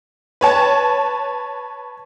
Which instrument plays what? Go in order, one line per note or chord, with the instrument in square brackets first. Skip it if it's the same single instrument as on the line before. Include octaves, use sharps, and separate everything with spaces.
[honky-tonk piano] B4 C#5 A5